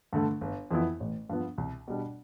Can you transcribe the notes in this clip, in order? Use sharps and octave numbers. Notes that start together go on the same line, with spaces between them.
G2 D3 A3
G1
F2 E3 B3 E4
A1
G2 F3 B3
C2
B2 G3 D4